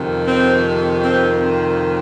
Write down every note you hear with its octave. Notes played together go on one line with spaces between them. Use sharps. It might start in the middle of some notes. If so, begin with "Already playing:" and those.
Already playing: F2 C3 D#3
C4
C4